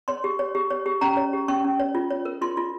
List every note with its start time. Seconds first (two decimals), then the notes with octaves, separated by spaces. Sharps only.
0.08 C#5 C6
0.24 G4
0.39 C#5
0.55 G4
0.70 C#5
0.86 G4
1.01 C#4 A#5
1.17 C#5
1.33 G4
1.48 C#4 C#6
1.64 C#4
1.80 C#5
1.95 F4
2.10 C#5
2.25 A#4
2.41 F4 C6
2.57 F4